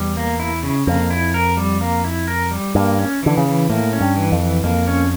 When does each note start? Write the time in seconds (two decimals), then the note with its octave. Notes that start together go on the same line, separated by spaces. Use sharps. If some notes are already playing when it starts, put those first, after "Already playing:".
Already playing: E2 G3
0.17 A#3
0.40 E4
0.63 C#3
0.87 F2 A#3
1.10 E4
1.34 A#4
1.57 G3
1.81 A#3
2.04 E4
2.28 A#4
2.51 G3
2.75 G2 A#3
2.99 C#4
3.23 D3 E3
3.37 C#3
3.46 E3
3.69 A2 A#3
3.93 C#4
4.01 G2
4.16 E3
4.32 F2
4.40 E3
4.64 F2 A#3
4.87 C#4